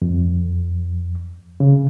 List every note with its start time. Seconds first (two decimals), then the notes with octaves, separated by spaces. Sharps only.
0.02 F2
1.60 C#3